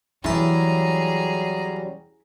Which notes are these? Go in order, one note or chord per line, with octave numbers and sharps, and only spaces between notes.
E2 F#3 G3 C#4 E4 G#4 A5 A#5